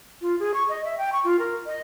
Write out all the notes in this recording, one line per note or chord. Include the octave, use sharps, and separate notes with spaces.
F4
G#4
C#6
D#5
E5
G5
C#6
F4
A#4
D#5